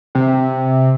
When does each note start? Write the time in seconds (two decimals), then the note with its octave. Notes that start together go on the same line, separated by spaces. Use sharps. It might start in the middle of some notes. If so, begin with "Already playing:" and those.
0.15 C3